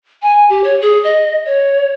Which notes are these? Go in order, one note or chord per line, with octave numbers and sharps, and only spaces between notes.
G#5
G4
C#5
G#4
D#5
C#5